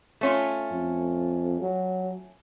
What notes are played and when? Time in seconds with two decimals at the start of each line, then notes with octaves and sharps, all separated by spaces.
0.21 A3 C#4 F4
0.72 F2
1.62 F#3